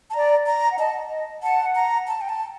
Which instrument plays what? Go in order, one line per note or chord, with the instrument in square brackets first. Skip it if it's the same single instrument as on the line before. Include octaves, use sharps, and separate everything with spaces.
[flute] A5
[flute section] D5 [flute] A#5
[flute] A#5
[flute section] F#5
[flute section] D#5 [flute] A5
[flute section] D#5
[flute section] F#5 [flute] A5
[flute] A#5
A5
G5
A5